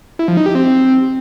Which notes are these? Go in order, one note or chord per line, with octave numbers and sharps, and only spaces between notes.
E4
F3
D#4
G4
C4